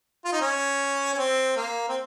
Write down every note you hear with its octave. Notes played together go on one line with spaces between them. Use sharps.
F4
D#4
C#4
C#4
C4
A#3
C4